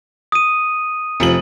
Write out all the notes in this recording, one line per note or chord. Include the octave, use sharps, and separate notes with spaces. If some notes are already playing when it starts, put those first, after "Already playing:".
D#6 D#7
F1 F3 F#7